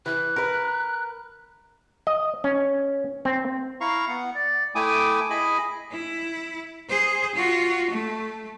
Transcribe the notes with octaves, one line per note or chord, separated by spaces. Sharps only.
E3 F#6
A#4 B4
D#5
C#4
C4
E4 F5 A#5 C#6
B3 F#5
D5
A3 E4 G5 G#5 D6 D#6
E4 G#4 D#5 G#5 B5
E4
G#4 C5
F4 F#4
A3